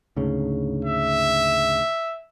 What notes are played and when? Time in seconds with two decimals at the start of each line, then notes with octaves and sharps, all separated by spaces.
0.17 D2 G#2 C#3
0.85 E5